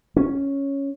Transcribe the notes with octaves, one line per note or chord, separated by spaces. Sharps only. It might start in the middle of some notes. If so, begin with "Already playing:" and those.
C#4